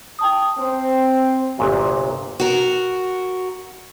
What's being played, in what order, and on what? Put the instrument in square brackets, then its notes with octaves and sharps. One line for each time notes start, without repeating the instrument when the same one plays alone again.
[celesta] G5 A5 D#6
[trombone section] C4 [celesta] C5
[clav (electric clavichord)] G1 C2 A#2 F#3
[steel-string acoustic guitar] F#4 A#4